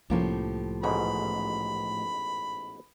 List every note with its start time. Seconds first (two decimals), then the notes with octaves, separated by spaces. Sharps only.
0.10 C2 A2 F3 A#3 C#4 G4
0.83 A1 G#2 B2 B5